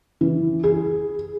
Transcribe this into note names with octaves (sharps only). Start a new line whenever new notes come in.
E3
G#4